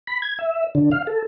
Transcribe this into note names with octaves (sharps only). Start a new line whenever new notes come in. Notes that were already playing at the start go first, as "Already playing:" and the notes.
B5
G#6
E5
D3
F5
A4